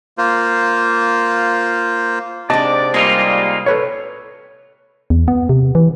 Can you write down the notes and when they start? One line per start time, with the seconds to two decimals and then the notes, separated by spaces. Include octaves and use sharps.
0.18 A#3 F4 C5
2.50 G#2 C3 G#3 D4 D5 D#5 A5
2.94 G3 G#3 A#3 D#4 F4 A#4 D5
3.66 A4 B4 C#5
5.10 E2
5.28 B3
5.49 C3
5.75 E3